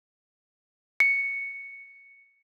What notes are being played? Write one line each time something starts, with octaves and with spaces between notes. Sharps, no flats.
C#7